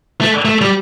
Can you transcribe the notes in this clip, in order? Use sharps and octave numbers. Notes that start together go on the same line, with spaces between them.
A3
A3
G3